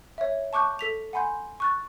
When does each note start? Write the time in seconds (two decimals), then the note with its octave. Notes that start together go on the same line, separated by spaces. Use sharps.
0.18 C#5 E5
0.53 A5 C#6 D6 F#6 G6
0.79 A4 B6 F7
1.13 F#5 G#5 B5 C6 G6
1.60 C#6 F#6 A6